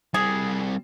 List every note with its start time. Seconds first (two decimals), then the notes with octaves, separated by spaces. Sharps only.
0.14 G3 C4 G#4